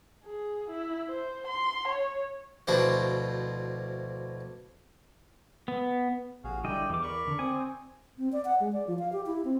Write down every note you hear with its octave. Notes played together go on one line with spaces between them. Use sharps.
G#4
E4
C5
C6
C#5
D2 B2 F3 D4 E4 C5
B3
A1 F#4 G#4 F5
D3 G3 E4 D5 D#5 G5
E2 E3 D6
A#4 D5 B5 C#6
D3
C4 G#5 D#6
C4
D5
F#5
G#3
D5
F3
F5
G4
E4
C4